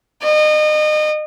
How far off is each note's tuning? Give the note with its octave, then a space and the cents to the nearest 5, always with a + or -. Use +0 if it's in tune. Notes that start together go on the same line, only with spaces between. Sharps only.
D#5 -30